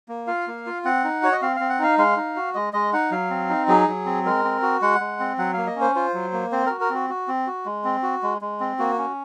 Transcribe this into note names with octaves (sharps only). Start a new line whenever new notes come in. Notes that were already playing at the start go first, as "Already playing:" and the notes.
A#3
F4 F5
A#3
F4
C4 F#5
D#4
F#4 C#5
D#5
C4 F5
C4 F5
F#5
D#4 F5
G#3 F5
D#4
F#4
G#3 D#5
G#3 D#5
D#4 F#5
F#3 F5
C4
D#4
F#3 G#4
F#3
C4
G#3 A#4
C4
F#4
G#3 F#5
G#3
C4
F#3 F#5
A#3 F5
D#5
C#4
C5
F4 C5
F#3
A#3
C4 C5
F#4 A#4
A#4
C4 F#4
F#4
C4
F#4
G#3
C4
F#4
G#3
G#3
C4
A#3 F#4
C#4